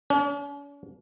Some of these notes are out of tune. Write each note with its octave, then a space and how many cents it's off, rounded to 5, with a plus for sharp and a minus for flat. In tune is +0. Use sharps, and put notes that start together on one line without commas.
C#4 +45